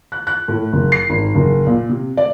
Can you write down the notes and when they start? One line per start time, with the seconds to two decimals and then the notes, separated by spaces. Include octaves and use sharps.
0.12 F#6
0.27 F#6
0.48 A2
0.73 F#1
0.92 C7
1.10 G#1
1.35 F#1
1.66 A#2
1.89 C3
2.17 D5